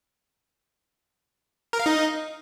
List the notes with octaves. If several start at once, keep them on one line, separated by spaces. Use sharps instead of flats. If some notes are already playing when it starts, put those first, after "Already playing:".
A#4
F5
D#4